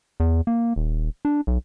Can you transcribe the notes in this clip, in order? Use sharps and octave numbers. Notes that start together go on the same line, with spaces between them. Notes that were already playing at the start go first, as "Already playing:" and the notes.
E2
A#3
D#1
D4
B1